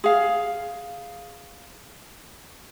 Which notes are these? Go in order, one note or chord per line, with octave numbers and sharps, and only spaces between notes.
G#4 F5